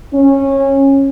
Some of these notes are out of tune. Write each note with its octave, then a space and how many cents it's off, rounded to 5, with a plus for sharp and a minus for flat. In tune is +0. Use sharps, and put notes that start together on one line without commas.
C#4 -20